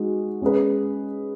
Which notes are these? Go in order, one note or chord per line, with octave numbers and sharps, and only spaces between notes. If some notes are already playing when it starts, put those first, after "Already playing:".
Already playing: G#3 D#4 F#4
G#3 C#4 G#4 B4